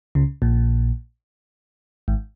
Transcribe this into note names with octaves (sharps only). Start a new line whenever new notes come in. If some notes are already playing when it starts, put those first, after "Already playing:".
C#2 C#3
A#1 A#2
G#1 G#2